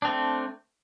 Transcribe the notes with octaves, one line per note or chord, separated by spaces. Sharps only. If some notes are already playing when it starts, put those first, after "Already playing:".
A3 C4 D4